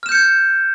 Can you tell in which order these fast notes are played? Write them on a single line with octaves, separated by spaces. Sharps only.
F6 E7 G6 C#7 G#6